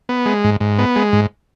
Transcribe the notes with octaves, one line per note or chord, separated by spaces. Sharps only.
B3
G#3
G#2
G#2
B3
G#3
G#2